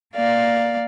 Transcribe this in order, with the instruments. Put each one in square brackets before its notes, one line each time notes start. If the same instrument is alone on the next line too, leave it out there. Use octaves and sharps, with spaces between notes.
[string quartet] A#3 D5 F5